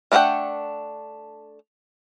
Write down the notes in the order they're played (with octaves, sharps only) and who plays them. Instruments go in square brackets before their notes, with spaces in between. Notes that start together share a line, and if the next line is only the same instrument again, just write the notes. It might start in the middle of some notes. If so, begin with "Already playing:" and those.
[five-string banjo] A3 D4 A#4 F#5 G5